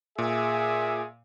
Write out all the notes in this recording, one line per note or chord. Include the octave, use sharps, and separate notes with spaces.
A#2 G#4 E5